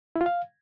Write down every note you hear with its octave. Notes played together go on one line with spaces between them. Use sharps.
E4
F4
F5